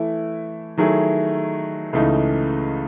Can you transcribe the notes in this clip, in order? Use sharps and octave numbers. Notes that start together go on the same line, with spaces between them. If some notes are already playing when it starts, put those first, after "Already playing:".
Already playing: E3 A3 E4
D#3 F#3 A3 E4 G#4
C#2 C#3 E3 A3 D#4